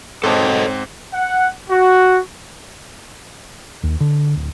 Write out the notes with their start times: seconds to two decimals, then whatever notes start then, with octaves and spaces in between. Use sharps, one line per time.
0.23 G#2 C4 A4 C#5 D#5 A5
1.14 F#5
1.70 F#4
3.83 D#2
4.00 D3
4.35 D1